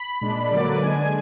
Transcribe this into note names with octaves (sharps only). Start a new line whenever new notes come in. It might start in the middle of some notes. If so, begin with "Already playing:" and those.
Already playing: B5
A#2 G#3 D4
D3 F#3 A#3 D5
B4
D3 G#3 D4 G#5